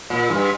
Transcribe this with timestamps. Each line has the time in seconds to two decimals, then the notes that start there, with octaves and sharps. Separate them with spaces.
0.10 A#2
0.30 G2